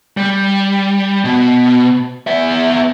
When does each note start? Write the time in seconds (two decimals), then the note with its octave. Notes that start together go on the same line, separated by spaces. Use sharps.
0.17 G3
1.25 B2
2.27 B3 E5